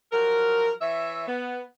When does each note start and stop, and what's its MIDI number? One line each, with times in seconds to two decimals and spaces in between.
0.12 0.70 53
0.12 0.70 54
0.12 0.70 70
0.80 1.23 52
0.80 1.23 73
0.80 1.23 76
1.26 1.60 59